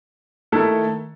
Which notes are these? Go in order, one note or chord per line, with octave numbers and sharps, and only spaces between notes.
D#3 A3 E4 A4